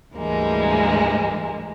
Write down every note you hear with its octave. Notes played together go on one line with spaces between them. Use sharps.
D2 G#2 E3 G3 G#3 A#3